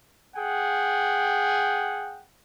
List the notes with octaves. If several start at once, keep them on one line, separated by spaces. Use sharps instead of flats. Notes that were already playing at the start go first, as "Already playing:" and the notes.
G#4 F#5 G5